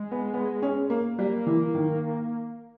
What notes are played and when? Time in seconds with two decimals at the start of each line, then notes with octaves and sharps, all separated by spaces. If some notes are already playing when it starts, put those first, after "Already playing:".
Already playing: G#3
0.12 B3
0.34 B3
0.62 C#4
0.90 A#3
1.18 G3 A#3
1.47 E3
1.75 D#3